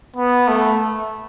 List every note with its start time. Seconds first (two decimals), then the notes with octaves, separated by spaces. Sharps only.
0.16 B3
0.48 A3